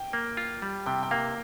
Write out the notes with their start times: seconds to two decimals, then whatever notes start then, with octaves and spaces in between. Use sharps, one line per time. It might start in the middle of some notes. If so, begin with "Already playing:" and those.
Already playing: G5
0.13 A#3
0.37 F4
0.62 G3
0.86 C3 G5
1.03 G5
1.11 A#3 F5